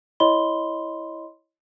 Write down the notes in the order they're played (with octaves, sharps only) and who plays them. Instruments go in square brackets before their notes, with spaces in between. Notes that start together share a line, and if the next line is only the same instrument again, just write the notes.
[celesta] E4 C#5 D#5 B5 C6 G7